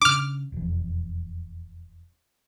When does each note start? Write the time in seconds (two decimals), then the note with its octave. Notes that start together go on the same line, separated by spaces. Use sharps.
0.01 C#3 D4 D6 F6
0.52 E1 F2